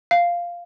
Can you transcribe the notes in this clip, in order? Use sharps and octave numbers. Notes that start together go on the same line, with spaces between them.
F5